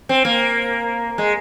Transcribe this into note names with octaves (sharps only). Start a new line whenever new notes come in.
C4
A#3
G#3